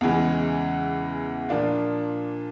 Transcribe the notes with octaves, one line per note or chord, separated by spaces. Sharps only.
E2 C#3 E3 G#3
A#2 F3 A#3 D4 F4